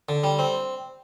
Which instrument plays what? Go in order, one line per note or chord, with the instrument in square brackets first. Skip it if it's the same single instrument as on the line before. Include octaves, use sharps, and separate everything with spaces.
[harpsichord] D3
G3
C4